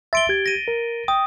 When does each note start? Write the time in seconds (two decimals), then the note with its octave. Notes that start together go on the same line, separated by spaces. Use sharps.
0.13 E5 C6 A6 D7 G7
0.29 G4 G#6
0.46 A#6 D#7
0.68 A#4
1.08 G5 D#6